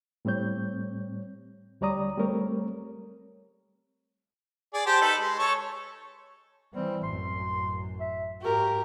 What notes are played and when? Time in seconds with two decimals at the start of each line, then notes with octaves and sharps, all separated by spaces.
0.25 A2 G3 C4 C#5 G6
1.81 D2 G3 C#5 D5 A#5 D#6
2.18 G3 A3 C4 A#4 C#5
4.74 G#4 D5
4.86 G4 C5 A5
5.01 D#4 A4 B4
5.19 G#3
5.39 A4 C#5 C#6
6.74 E3 G3 C4
7.03 A1 F#2 C6
8.00 E5
8.42 G#2 F#4 G4 A#4